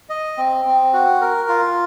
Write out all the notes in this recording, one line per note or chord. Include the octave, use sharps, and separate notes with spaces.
D#5
C4
C4
F#4
A#4
F4